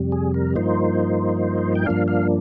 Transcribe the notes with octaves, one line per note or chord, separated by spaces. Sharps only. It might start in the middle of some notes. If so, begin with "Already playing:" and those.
Already playing: F2 C3 G3
G#4
A#4
G2 F3 A#3 D#4 C5
G5
G2 F3 A#3 D4 F5
F5